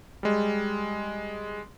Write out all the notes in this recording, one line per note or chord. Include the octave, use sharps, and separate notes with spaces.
G3 G#3